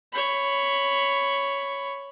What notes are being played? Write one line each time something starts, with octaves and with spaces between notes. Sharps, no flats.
C#5 B5